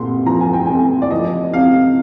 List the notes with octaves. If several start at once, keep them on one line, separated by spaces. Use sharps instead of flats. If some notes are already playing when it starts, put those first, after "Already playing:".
Already playing: C2 A#2 C6
F3 A#5
G#5
G5
C2 G#5
D5
F3 D#5
C3 F5